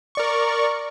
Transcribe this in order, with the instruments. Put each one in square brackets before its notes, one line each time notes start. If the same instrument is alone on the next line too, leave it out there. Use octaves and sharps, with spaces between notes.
[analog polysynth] A#4 D5 C#6